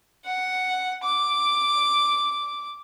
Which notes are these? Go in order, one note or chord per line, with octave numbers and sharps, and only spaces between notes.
F#5
D6